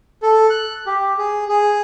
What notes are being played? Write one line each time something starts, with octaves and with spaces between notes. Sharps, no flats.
A4
F#6
G4
G#4
G#4